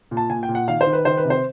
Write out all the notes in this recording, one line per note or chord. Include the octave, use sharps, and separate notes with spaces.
A#2
A5
A#2 G#5
G5
A#2
F#5
D#3 F5
C5
D#3
B4
D#3 C5
B4
C3
C5